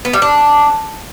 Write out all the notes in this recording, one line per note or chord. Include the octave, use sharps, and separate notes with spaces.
B3
G3
D4